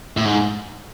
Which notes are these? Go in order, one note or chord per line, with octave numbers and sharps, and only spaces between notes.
A2
G#2